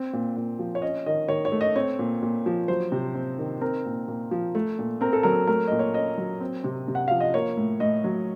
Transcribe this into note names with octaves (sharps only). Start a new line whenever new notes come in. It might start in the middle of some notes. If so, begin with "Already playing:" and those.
Already playing: C4
A#2
A#2
F3
C#5
C#4 D#5
D#3 D#5
D#3 C#5
C#5
A3
D#5
C4 C#5
A#2
A#2
F3
F#3 C5
C3
C4
D#3
C4 A#4
A#2
A#2
F3
A3
A#2
C4 A#4
A4
F#3 A#4
A3 A#4
A#2 D#5
C#5
C#4 D#5
F#3
C4
C3
C3
F#5
F3 F5
D#5
A#3 C#5
A2
A2 D#5
F#3